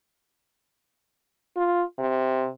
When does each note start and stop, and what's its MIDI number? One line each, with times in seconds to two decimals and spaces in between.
1.56 1.82 65
1.99 2.48 48